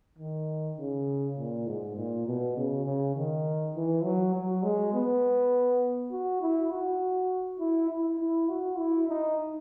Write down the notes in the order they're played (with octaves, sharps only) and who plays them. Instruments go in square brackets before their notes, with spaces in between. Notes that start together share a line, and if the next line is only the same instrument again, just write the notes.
[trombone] D#3
C#3
A#2
G#2
A#2
B2
C#3
C#3
D#3
E3
F#3
F#3
G#3
B3
F#4
E4
F#4
E4
E4
E4
F#4
E4
D#4